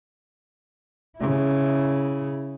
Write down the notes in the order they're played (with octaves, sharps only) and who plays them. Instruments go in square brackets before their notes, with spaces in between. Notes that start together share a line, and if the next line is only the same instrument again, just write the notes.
[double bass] C#3 E4